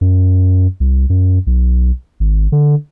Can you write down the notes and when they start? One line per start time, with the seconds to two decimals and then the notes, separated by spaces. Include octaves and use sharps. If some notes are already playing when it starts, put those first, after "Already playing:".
0.01 F#2
0.80 C2
1.09 F#2
1.47 B1
2.20 G#1
2.52 D3